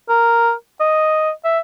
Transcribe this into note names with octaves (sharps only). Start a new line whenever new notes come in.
A#4
D#5
E5